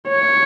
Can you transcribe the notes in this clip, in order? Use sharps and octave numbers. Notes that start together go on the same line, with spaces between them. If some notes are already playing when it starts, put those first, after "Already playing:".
C#5